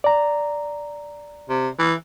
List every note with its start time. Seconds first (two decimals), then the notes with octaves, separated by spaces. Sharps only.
0.04 D5 A#5
1.50 C3
1.79 E3